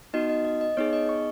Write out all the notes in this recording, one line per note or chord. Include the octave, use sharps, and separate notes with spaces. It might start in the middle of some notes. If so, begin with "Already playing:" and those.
B3 D#4 F#4 D#5
D#5
D#5
D#5
B3 D#4 G#4 C#5
D#5
C#6